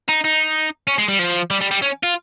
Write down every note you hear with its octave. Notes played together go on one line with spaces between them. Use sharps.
D#4
D#4
C#4
G#3
G3
F3
G3
G3
G3
C#4
F4